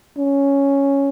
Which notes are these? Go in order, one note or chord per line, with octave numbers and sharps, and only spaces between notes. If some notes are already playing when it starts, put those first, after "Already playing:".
C#4